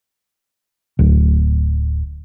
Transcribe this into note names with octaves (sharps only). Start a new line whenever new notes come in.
D1